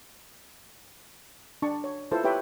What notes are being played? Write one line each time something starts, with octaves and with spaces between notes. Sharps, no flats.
D4 A5 C#6
C#5
E4 F4 A4 B4 C5 A5
G4 B4 C#5 E5 G5